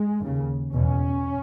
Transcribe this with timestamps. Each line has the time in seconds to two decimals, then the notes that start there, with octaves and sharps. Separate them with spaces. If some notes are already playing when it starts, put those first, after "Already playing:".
Already playing: G#3
0.22 D#2 C#3
0.73 E2 B2 C#4